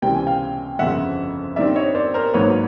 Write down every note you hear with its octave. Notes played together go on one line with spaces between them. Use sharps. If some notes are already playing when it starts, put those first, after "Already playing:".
C#2 C3 E3 G3 C4 G5
G#5
F5 G5
G1 F2 C#3 F3 E5 F#5
G2 D#3 G3 C4 D5 E5
C#5 D#5
C5 D5
A#4 C5
G#1 G#2 D#3 F#3 A#3 B4 C#5